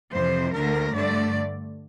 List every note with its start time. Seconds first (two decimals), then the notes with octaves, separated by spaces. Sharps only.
0.12 F2 C3 E3 C5
0.53 D2 D3 A3 A#4
0.93 G2 D3 A3 D5